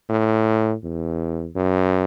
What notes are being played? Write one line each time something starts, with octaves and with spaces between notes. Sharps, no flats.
A2
E2
F#2